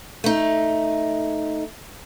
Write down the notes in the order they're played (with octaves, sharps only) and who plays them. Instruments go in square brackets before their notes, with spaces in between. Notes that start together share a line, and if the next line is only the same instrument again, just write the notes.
[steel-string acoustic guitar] A3 D#4